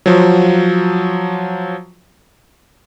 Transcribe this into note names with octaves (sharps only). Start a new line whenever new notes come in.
F3 F#3